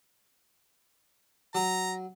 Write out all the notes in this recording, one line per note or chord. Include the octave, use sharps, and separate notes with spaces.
F#3 A#5